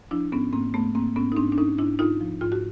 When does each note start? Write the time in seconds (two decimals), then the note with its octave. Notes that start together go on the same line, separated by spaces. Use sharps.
0.11 F3 D4 E4
0.32 G#2 B3 C#4
0.53 G#2 A#3 C4
0.74 G#2 A3 B3
0.95 G#2 A#3 C4
1.16 G#2 B3 C#4
1.32 D#4
1.37 G#2 C4 D4
1.52 D4
1.58 G#2 C#4 D#4
1.78 G#2 D4 E4
1.99 G#2 D#4 F4
2.21 F3
2.41 G#2 F4
2.52 F#4